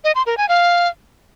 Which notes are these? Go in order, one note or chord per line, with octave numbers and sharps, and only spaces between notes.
D#5
C6
A#4
G#5
F5